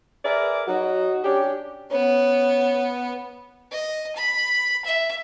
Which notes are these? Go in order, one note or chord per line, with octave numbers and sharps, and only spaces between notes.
G#4 A#4 B4 D5 E5
F#3 D#4 F#4
C#4 D4 G4
B3 C#4
D#5
B5
E5